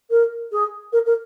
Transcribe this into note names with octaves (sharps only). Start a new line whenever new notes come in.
A#4
G#4
A#4
A#4